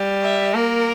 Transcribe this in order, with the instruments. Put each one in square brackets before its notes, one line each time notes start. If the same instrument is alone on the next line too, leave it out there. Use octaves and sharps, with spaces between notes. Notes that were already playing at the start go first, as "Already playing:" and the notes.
Already playing: [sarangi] G3
[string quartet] E5
[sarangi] A#3 [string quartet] A#4